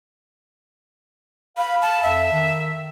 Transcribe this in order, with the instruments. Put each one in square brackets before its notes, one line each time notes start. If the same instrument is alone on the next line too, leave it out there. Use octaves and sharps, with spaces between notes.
[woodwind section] F5 [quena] B5
[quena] A5
[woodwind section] F2 [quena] E5
[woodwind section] D#3